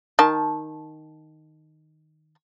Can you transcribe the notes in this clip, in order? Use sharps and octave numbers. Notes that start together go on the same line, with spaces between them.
D#3 A5